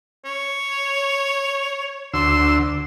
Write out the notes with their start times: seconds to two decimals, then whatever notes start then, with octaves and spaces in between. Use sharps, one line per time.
0.25 C#5
2.14 D2 C6 E6